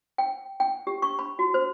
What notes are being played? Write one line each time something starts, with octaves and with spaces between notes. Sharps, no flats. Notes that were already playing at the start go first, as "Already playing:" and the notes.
G5
G5
G4
C#6
B5
F#4
C5